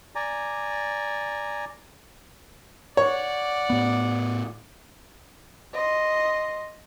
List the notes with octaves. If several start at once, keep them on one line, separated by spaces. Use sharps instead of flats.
D5 G#5 A#5
C#5 D5 F#5
A2 B3
D#5 C6